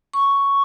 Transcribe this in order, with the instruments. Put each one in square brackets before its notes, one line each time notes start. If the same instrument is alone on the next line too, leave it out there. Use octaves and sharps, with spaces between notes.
[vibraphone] C#6